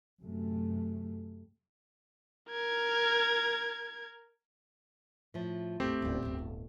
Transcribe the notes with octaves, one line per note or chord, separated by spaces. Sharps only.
F#2 C3 A3
A#4 G#6
A2 F3
G#1 E2 A3 C4 G4
D1 G#1
D1 G1